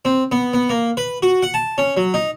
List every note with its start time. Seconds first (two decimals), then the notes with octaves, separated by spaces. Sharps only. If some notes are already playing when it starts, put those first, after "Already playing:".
0.05 C4
0.32 B3
0.54 B3
0.69 A#3
0.97 B4
1.23 F#4
1.43 F#5
1.54 A5
1.78 C#4
1.97 F#3
2.14 D#4